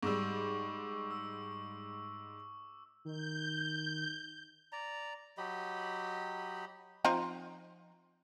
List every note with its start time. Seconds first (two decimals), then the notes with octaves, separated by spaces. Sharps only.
0.03 G#2 G3 C#6 D6 E6
1.11 D6 E6
3.05 D#3 G6
4.72 D5 A#5
5.38 F#3 G4 D#5 B5
7.05 F3 C4 D#4